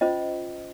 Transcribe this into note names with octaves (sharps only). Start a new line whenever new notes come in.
C#4 F4 C5 D#5